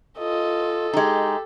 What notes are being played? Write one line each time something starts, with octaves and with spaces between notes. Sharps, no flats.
F4 A4 D#5
G#3 D#4 G4